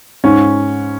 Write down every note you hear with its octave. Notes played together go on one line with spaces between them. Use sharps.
G#2 C#4